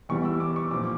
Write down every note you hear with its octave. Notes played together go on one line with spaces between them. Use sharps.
E2 E3 G3 C#6
E6
D6
C#6
A#2 F3 D6